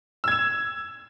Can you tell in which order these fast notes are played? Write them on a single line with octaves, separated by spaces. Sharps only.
E6 G#6 E7